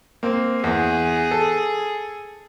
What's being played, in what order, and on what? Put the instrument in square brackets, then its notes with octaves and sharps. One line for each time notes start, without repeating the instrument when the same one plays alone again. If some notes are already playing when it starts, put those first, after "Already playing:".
[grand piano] A#3 C4
[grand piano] E2 [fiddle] G#4
[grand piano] A4